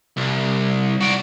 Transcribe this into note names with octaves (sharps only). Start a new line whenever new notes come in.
C2
F#4 D5